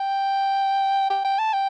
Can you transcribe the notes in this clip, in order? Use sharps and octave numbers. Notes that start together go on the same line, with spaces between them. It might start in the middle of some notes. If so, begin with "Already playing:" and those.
Already playing: G5
G5
G5
A5
G5